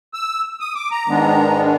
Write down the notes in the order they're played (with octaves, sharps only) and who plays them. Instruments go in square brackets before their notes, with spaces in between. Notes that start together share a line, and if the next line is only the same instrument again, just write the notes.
[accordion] E6
D#6
D6
A#5
G#2 D#3 G#3 B3 D4